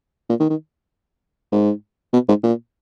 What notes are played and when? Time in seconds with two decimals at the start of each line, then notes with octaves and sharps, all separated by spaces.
0.29 A#2
0.40 D#3
0.50 D#3
1.52 G#2
2.13 B2
2.28 G#2
2.43 A#2